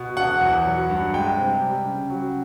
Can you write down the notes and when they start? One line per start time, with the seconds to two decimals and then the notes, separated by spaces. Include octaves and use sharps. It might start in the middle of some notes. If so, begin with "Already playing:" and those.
Already playing: B2
0.16 E1 F#5
0.41 E2
0.65 F#3
0.90 G2
1.14 G#3 G5
1.37 C3
1.61 G3
1.85 C#3
2.10 F#3